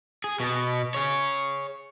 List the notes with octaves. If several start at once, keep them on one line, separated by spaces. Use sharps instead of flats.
G#4
B2
G#4 C#5